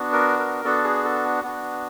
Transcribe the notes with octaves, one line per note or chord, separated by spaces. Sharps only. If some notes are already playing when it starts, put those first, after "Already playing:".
Already playing: B3 D4 F#4
A#4
A#4
B3 D4 F#4 A4
G#4
A4
B3 D4 F#4